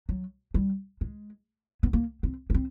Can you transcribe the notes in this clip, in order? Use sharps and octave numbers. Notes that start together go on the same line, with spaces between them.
F#3
G3
G#3
B3
A#3
C4
B3
C4